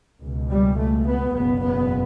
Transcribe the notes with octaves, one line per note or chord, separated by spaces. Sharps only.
C#2 B2
G3
A3
B3
F#1 E2 B2 B3
B3